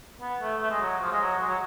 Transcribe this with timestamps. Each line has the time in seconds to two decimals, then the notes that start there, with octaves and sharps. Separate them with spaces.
0.21 B3
0.41 A3
0.61 A3
0.71 G#3
0.81 F#3
1.01 F3
1.12 G#3
1.21 F#3
1.41 G#3
1.48 F#3